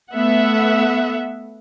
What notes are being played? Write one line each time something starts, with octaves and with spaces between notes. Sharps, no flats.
A3 B3 E5 F#5